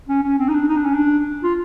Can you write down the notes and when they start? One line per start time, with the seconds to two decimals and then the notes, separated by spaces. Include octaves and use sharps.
0.08 C#4
0.23 C#4
0.38 C4
0.48 D#4
0.53 D4
0.68 D#4
0.76 D4
0.85 C#4
0.94 D4
1.43 F4